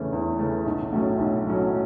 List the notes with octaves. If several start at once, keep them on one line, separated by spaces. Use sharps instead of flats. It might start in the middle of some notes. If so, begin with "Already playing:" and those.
Already playing: E2 C#3 E3 A3 C#4
E2
C#3 E3 A3 C#4
B1
A2 F#3 A3 C#4
B1
A2 F#3 A3 C#4